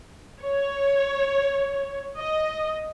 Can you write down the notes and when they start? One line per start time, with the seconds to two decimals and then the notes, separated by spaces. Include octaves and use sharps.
0.40 C#5
2.17 D#5